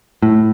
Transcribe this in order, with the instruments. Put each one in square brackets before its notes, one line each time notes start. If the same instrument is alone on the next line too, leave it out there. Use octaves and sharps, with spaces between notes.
[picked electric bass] A2